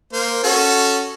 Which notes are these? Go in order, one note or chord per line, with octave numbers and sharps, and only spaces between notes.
A#3 C5
C#4 F#4 A4